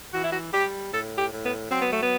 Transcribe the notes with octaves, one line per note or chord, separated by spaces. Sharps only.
E3 F#4
E4
F#4
G3 G4
A2 A4
G4
A2
B3
F#3 C4
B3
A3
B3